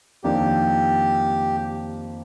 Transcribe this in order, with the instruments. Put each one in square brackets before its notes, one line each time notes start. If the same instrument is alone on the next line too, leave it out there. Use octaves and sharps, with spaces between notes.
[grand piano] F2 D#3 A#3 D4 [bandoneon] G4